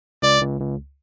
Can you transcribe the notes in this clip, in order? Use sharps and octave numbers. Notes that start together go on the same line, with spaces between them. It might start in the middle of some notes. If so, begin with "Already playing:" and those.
C#2 D5
C#2
C#2